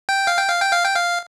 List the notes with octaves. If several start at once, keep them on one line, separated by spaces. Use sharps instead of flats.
G5
F5
G5
F5
G5
F5
G5
F5